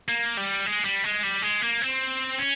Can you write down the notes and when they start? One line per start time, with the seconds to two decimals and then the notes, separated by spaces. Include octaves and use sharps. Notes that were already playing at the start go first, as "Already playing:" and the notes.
0.08 A#3
0.37 G3
0.66 G#3
0.85 G3
1.04 G#3
1.24 G3
1.42 G#3
1.62 A#3
1.82 C4
2.39 C#4